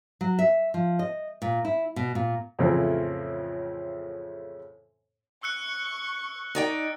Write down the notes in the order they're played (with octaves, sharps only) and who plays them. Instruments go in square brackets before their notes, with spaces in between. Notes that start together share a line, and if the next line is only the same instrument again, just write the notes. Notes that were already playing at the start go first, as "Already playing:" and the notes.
[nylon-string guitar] F#3
E5
F3
D#5
A#2
E4
B2
A#2
[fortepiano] F2 A2 C#3 E3 F3 C4
[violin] C#6 [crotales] E6 F#6 C#7
[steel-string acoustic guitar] D#4 D5 G5